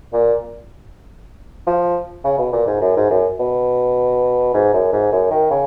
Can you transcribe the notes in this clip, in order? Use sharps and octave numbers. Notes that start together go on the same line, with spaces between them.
A#2
F3
C#3
B2
A#2
G#2
F#2
G#2
F#2
B2
G#2
F#2
G#2
F#2
D#3
C#3